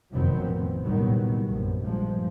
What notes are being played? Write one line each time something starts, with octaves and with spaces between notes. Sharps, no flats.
F1 F2 D#3 F#3 B3 C4
A1
C2 A#2 D#3 F#3 G3 B3
A#1 F#2
G2 F3 G#3